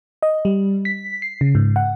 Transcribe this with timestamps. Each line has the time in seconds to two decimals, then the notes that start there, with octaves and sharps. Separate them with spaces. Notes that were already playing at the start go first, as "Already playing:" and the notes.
0.23 D#5
0.45 G3
0.85 B6
1.22 C7
1.41 C#3
1.55 G#2
1.76 F#5